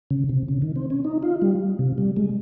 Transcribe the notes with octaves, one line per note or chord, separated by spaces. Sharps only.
C#3
C3
C#3
D#3
C4
C#4
D#4
F4
G3
C3
G3
G#3